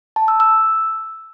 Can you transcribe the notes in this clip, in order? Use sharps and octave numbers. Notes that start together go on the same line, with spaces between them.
A5
E6
E6